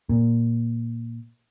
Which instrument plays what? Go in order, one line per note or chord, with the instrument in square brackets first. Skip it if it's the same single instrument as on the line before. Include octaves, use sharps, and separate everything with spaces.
[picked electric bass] A#2